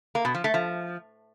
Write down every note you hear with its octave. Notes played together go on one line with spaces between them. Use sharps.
A#3
B2
F3
A3
F3